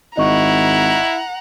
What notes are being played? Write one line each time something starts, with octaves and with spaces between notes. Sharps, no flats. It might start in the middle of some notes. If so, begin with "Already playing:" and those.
G#1 E4 D#5 F#5 A#5 C#6